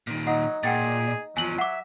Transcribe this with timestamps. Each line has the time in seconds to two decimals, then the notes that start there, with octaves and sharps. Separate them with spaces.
0.07 A#2 D#3
0.27 F#3 D#4 F#5
0.63 A#2 G#4 F#5 G5 A6
1.37 E2 F3 F#3 G#5 F#7
1.58 E5 F#5 D6